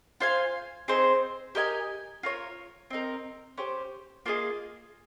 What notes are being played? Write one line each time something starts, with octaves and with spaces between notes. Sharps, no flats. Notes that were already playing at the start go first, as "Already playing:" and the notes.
F4 C5 F5 G#5
C4 D#4 G#4 C5
G4 A#4 D#5 G#5
F4 A#4 C#5
C4 D#4 A#4
C#4 G4 C5
A#3 F4 G#4 D#5